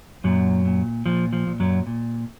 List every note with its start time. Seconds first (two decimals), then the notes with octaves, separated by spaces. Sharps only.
0.24 F#2 A#2 F#3
0.65 A#2
1.06 A#2 F3
1.33 F3
1.47 A#2
1.60 F#2 F#3
1.87 A#2